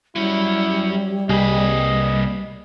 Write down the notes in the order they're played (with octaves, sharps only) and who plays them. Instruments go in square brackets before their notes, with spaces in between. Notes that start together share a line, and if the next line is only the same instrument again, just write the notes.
[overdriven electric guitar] F#3 C#4 [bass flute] G3 [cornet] E4
[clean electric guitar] C2 G#4 [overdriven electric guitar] A#3 B4 [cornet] D#5